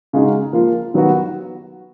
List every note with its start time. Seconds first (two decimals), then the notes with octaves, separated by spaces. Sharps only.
0.13 C#3 G#3 D#4 F#4
0.53 F3 A#3 F4
0.94 D#3 F#3 B3 F#4